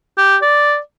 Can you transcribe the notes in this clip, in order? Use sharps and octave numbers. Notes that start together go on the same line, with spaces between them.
G4
D5